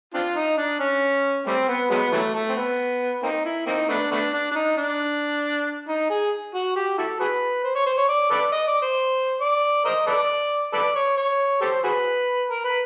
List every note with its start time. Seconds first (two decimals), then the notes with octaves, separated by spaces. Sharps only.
0.14 C4 D4 F4
0.36 D#4
0.58 D4
0.80 C#4
1.46 G3 A3 C4
1.68 B3
1.90 F#3 G#3 B3
2.13 E3 F#3 A3
2.35 A3
2.49 C4
2.57 B3
3.23 A#3 C4 D#4
3.45 E4
3.66 A#3 C4 D#4
3.89 A3 B3 D4
4.11 A3 B3 D4
4.33 D4
4.51 D4
4.55 D#4
4.77 D4
5.88 D#4
6.10 G#4
6.54 F#4
6.76 G4
6.98 E4 F#4 A4
7.20 F#4 G#4 B4
7.64 C5
7.75 C#5
7.86 C5
7.98 C#5
8.09 D5
8.31 A4 B4 D5
8.52 D#5
8.68 D5
8.82 C5
9.40 D5
9.85 A#4 C5 D#5
10.07 A4 B4 D5
10.73 A4 B4 D5
10.95 C#5
11.17 C#5
11.61 G4 A4 C5
11.84 F#4 G#4 B4
12.50 A#4
12.65 B4